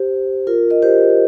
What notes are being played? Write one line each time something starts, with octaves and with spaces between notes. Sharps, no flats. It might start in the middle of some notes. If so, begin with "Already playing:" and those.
Already playing: G4 C5
F4 A#4
A#4 D#5
G4 C5